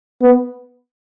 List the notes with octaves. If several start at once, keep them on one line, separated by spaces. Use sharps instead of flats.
B3